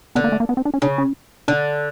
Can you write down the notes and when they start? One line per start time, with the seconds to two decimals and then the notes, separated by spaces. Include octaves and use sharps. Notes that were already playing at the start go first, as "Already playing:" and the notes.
0.15 D3 B3
0.24 A#3
0.32 A3
0.40 A#3
0.49 B3
0.57 C4
0.65 D4
0.74 C#4
0.82 C#3 D4
0.98 C#4
1.48 D3 D4